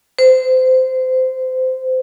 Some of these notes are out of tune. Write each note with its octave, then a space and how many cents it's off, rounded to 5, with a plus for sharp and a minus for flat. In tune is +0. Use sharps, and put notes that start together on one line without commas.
C5 -20